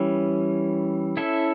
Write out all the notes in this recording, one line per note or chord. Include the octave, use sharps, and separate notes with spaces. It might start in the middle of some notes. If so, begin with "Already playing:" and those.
Already playing: E3 G3 C#4
C#4 E4 A4 E5